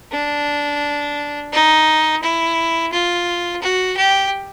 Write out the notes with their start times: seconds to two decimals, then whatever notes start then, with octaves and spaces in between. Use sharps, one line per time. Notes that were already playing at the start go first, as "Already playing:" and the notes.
0.12 D4
1.52 D#4
2.22 E4
2.92 F4
3.62 F#4
3.97 G4